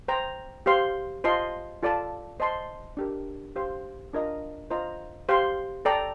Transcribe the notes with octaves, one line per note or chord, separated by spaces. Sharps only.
C5 G5 A#5
G4 C5 F5 C6
F4 C5 D#5 A5 C6
F4 A4 D5 A5
C5 D#5 A5 C6
D4 G4 A#4
G4 C5 F5 C6
D4 F4 A#4 D#5 A#5
F4 C5 D#5 A#5
G4 C5 F5 C6
A4 D5 G5 A#5